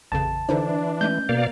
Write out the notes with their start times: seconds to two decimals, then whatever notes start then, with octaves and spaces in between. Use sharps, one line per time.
0.12 A1 F2 C#3 A5
0.49 D3 E3 D4 D#4 C5
1.01 G#3 A3 C#4 G6
1.29 B2 A#3 D5 F5